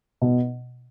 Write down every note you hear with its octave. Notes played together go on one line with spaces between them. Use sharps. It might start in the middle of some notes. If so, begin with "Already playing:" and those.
B2